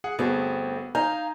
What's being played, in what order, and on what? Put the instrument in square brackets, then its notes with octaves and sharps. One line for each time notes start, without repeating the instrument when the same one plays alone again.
[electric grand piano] G#4 [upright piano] F#5
[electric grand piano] G1 [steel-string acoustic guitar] A3 C4 [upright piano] B3 F#4 G#4
[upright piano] D#4 [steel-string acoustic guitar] F5 [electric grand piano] G#5 A#5 G6